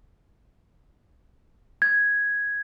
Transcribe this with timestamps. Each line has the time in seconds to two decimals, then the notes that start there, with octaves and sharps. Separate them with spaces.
1.82 G#6